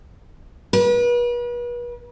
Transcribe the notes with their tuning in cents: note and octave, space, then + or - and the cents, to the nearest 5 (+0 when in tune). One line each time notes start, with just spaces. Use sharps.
B4 -40